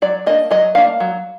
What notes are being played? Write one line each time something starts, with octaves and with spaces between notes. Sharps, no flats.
F#3 D5
A#3 D4 D#5
F#3 D#5
A#3 D4 F5
F#3